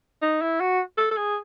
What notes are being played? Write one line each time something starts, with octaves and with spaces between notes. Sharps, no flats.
D#4
E4
F#4
A4
A4
G#4